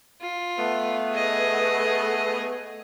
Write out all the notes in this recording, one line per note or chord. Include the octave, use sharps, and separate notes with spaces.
F4
A3 B3
G#4 D#5